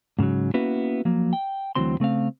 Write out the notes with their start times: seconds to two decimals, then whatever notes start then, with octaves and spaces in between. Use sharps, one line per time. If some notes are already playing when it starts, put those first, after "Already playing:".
0.19 G#2 C#3 E3 F#3
0.54 A#3 B3 C#4 E4 F#4 B4
1.05 F3 F#3 A#3
1.33 G5
1.75 D2 A#2 E3 F#3 C4 C6
2.00 C#3 A3 C4 F5